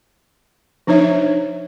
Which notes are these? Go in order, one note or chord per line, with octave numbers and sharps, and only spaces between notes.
F3 D4 D#4 C#5 E5